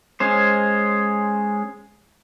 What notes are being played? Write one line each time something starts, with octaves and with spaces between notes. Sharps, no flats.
G#3 C#4 C5